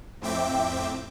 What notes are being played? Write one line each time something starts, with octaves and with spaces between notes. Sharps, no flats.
F2 A2 C4 E5 G5 D6